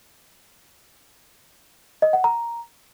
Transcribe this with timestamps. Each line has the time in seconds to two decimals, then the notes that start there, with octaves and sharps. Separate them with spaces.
2.02 D#5
2.13 F#5
2.24 A#5